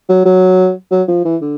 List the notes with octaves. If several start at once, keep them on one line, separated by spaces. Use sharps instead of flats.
F#3
F#3
F#3
F3
E3
D3